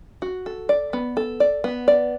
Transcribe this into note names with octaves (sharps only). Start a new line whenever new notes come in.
F#4
A4
D5
B3
A4
D5
B3
D5